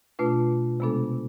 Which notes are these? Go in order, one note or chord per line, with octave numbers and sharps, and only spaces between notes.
B2 A3 D4 F4 B4
C3 G#3 B3 D4 A4